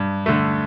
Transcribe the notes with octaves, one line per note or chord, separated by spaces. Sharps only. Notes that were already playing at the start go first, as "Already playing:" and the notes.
Already playing: G2
D3 A3